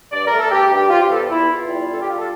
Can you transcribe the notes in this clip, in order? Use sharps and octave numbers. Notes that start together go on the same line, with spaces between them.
G2 D5
A#4
A3
A4
G2 G4
G2 G4
C3 F4
G4
E2 A4
E2 E4
E2 F4
G3
D3 A4
G4
G3 F4
A4